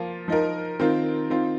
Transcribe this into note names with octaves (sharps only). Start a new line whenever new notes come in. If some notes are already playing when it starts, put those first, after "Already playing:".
Already playing: F3 A#3 F4
F3 D#4 A#4
D#3 C4 F4 A#4
D#3 C4 F4